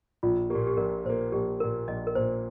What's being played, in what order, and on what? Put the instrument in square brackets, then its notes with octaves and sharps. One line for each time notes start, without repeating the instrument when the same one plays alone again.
[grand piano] A#1 [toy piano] F4
[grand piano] A#2 A#3 [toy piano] G4
[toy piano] G4
[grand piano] A#1 [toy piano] A#4
[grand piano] A#2 A#3 [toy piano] C5
[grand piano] A#1 [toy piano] G4
[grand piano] A#2 A#3 [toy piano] A#4
[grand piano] A#1 [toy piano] D#5
[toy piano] A#4
[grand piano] A#2 A#3 [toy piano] C5